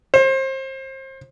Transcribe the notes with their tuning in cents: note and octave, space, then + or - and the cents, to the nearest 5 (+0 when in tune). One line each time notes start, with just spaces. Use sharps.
C5 +30